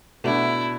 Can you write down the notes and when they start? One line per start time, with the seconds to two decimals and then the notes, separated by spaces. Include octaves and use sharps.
0.24 B2 A3 D4 E4